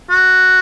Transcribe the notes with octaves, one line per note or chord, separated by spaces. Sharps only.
F#4